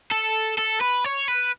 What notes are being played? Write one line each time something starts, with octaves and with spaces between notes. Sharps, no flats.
A4
A4
B4
C#5
B4